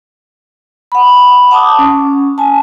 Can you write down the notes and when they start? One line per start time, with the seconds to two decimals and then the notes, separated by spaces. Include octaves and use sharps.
0.92 F#5 B5
1.51 F#5 A5 D6 D#6
1.79 C#4
2.38 G#5 A5